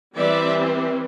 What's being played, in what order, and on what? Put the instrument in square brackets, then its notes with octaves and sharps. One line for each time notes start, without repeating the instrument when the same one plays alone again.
[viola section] E3 G3 C4 D5 E5